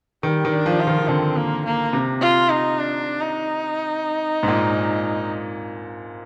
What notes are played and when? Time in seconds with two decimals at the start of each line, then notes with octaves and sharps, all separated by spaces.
0.23 D#3 G3
0.45 D#3
0.52 D4
0.66 F3
0.80 F4
0.87 D#3
0.98 D#3
1.08 D3 C4
1.36 A#3
1.65 A#3
1.93 C3
2.21 F4
2.50 D#4
2.79 D4
3.21 D#4
4.43 G#2
4.48 A#2